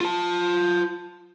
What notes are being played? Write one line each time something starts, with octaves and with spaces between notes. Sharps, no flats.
F4 A5